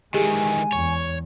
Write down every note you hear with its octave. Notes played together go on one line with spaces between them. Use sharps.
D#3 E3 G#3 G4 G#4 G#5
E2 C#5